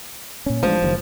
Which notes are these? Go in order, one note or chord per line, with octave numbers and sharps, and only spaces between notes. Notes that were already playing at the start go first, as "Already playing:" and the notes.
A#2 C#4
A1 F3 G#3 D4
F#1 D#3 G3